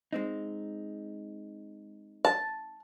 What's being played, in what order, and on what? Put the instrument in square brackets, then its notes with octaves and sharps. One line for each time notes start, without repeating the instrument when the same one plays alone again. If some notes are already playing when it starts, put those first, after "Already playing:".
[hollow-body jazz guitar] G#3 C4 D#4
[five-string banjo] A5